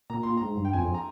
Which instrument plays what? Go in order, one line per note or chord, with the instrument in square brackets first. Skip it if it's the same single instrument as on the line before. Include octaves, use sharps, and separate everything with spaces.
[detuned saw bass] A#2 [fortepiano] A#5
[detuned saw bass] A#2 [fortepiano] C6
[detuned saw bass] G#2 [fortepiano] A#5
[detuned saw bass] G2
[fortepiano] G5
[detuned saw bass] F2 [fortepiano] G#5
[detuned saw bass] F2
[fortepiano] A#5